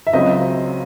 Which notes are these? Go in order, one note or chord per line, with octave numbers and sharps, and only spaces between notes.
E5
C#2 C#3 F#3 C4 D#5